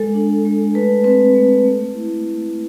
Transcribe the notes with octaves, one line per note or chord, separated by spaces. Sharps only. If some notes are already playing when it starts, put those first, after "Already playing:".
Already playing: G#3 A4
D4
G#3
A3 B4
C4 B4
A3
A3
E4